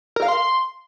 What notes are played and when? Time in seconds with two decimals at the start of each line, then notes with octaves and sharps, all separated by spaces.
0.16 A#4
0.22 F5
0.28 C6